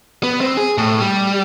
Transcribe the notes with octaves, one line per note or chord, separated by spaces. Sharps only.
B3
C4
G#4
A2
G3